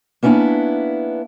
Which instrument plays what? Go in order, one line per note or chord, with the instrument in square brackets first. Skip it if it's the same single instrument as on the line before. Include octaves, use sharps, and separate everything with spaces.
[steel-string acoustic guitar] A#3 B3 C#4 D4 E4